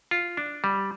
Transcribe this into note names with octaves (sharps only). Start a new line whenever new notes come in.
F4
D4
G3